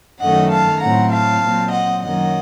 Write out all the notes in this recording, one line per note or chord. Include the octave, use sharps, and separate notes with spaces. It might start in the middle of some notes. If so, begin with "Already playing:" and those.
F#2 D#3 F#3 A3 D#5 F#5
F5 A5
A2 F#3 C4 F#5 A#5
F5 A5
A#2 F#3 C4
D#5 F#5
F#2 D#3 F#3 A#3 D#5 F#5